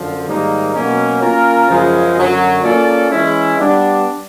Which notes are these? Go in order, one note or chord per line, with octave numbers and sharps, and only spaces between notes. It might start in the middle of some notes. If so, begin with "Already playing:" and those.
Already playing: F#2 D3 F3
G#2 D#3 G3 A#3 D#4
B2 F#3 A#3 C#4
A#3 C#4 F4 A#4
F#2 C#3 F3 G#3
F#2 D3 F#3
A#3 C#4 F4 A4 D5
E3 G#3 C#4 E4
G3 B3 D4